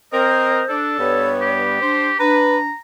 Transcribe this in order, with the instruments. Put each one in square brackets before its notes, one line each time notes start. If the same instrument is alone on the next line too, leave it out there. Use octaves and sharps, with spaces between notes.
[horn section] C4 A#4 [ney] C5 [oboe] D#5
[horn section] D4 [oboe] A4
[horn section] G2 G3 B3 [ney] C#5
[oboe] G4
[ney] D4 [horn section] C5
[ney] D4 [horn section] B4 [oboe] A#5